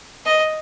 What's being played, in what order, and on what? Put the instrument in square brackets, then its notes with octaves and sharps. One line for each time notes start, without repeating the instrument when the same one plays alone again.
[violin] D#5